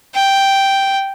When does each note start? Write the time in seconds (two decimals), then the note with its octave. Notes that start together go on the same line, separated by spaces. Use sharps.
0.15 G5